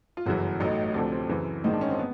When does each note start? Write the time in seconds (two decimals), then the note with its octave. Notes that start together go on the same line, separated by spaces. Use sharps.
0.17 F4
0.26 G1 F#2 C#3 E3 F#4
0.60 A1 A2 F#3 A3 D#4
0.94 D2 C3 F3 A3 D4
1.12 C4
1.29 F#2 C#3 E3
1.64 A#1 G#2 D#3 G#3 D#4
1.73 D4
1.81 C#4
1.90 C4
1.99 B3